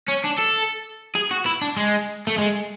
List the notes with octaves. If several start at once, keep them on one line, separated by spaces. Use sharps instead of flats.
C#4
D4
A4
G#4
F#4
E4
D4
G#3
A3
G#3